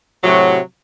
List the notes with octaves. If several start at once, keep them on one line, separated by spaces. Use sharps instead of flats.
A2 C3 F#3